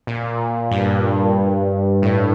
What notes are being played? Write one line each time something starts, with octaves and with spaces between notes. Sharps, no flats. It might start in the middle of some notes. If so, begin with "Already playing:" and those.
A#2
G2
A2